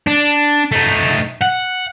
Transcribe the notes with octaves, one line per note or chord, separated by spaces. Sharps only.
D4
A3 D#4
F#5